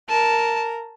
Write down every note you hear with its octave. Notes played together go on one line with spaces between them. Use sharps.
A#4 A5